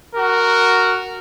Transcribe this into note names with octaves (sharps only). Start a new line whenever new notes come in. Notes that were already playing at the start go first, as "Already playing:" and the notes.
F#4 A#4